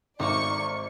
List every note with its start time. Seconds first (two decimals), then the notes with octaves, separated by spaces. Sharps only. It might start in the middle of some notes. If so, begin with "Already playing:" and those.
0.20 G#1 A3 A#3 D#4 D5 C#6 C#7